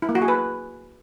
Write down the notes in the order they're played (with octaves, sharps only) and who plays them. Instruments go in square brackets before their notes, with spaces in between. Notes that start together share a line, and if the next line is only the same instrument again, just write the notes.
[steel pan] E4
A#3
F#4
G#4
B4